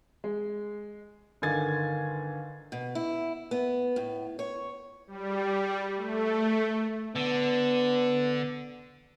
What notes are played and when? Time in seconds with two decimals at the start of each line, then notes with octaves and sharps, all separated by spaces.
0.24 G#3
1.42 G1 D3 D#3 G#5 G#6 A6
2.72 B2
2.95 E4
3.51 B3
3.96 A2
4.39 C#5
5.07 G3
5.96 A3
7.16 D3 B3